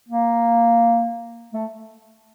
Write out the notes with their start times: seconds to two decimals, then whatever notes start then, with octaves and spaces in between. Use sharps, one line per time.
0.09 A#3
1.53 A3